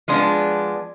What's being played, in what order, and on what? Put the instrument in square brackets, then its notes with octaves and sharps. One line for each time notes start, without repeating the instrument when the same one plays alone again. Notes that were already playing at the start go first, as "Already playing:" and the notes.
[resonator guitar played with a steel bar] F3 G#3 B3 D4